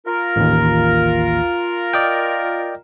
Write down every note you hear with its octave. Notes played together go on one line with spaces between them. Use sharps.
F4 A#4
A1 D#2
D5 D#5 G5